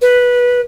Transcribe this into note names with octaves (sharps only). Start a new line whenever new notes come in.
B4